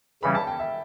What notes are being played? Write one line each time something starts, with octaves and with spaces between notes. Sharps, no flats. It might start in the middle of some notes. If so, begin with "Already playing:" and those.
C#3 E3 G3 C#4 B5
A5
G5
E5